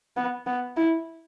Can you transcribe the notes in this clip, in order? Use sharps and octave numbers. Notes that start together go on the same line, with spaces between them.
B3
B3
E4